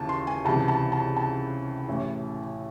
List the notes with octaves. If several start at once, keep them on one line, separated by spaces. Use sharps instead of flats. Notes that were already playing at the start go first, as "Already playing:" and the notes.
Already playing: D#2 C#3 E3 A5
C6
G#5
C#2 C3 E3 A5
A5
A5
A5
A1 A2 E3